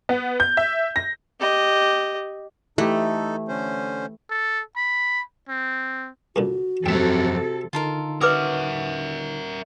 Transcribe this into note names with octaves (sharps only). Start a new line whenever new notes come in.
B3
G6
E5
A#6
G4 D#5
E3 A3 D#4 G4 A4
D3 C#4 C5
A4
B5
C4
C#2 A#2 D3 F#4
F2 C3 F#3 A4 E5 G5
D3 D#4 F4 A4 A#4
F#4 A#4 B4 C#5 E5 F#5 D6 D#6